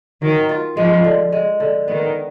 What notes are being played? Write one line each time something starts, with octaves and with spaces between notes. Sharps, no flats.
D#3 F#3
F4
F3 G#3
D3
G#3
D3
D#3 B3